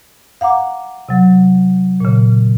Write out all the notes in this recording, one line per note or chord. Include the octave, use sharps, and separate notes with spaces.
F5 F#5 A#5 D6
C3 F#3
A#2 C#3